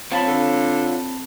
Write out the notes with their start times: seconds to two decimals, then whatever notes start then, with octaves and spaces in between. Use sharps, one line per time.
0.11 C4 F4 C#5 F5 A5 B5
0.27 D3